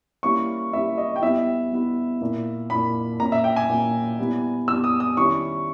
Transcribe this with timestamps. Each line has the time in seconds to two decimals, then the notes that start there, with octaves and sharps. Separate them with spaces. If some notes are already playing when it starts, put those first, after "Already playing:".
0.23 G3 A#3 C#4 E4 C#6
0.73 G3 A#3 C#4 E4 E5
0.98 D#5
1.16 G5
1.22 G3 B3 E4 E5
1.71 G3 B3 E4
2.21 A#2 A#3 E4
2.70 A#2 A#3 E4 B5
3.20 A#2 A#3 C#4 A#5
3.32 E5
3.44 G5
3.56 G#5
3.69 A#2 A#3 C#4
4.19 G3 B3 E4
4.68 G3 B3 E4 E6
4.84 D#6
5.00 D#6
5.17 D#3 G3 C#4 E4 C#6